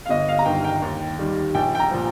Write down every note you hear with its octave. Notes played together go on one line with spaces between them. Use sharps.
F5
G1 D#5
F5
A#5
G2 D#3 G5
G5
D#2
D#3 G3
A#1 G5
G5
A#5
A#2 F3